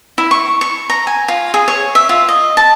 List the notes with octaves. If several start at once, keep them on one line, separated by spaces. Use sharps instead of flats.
E4
C#6
C#6
A#5
G#5
F4
G#4
C#5
E5
F4
D#5
A5